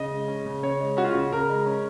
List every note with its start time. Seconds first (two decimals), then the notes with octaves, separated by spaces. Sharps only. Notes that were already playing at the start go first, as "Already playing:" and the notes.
Already playing: C#3 D#5
0.11 G#3
0.28 C#4
0.46 C#3
0.63 C#3 C#5
0.81 G#3
0.97 C#4 F#4
1.05 F4
1.13 C#3 F#4
1.32 C#3 A#4
1.49 G#3
1.66 C#4